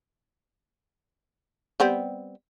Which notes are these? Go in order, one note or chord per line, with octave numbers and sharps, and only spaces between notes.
G3 B3 C4